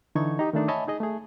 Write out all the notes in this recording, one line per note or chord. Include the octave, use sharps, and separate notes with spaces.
D3 E3 D#4 A4 C#6 G#6
D#4 G4
D#3 A3 D4 D#4
C#5 D#5 E5 G#5 A5 B5
D#4 G#4 D#5
A3 G#4